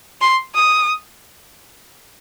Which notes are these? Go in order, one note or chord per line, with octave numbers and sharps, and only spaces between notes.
C6
D#6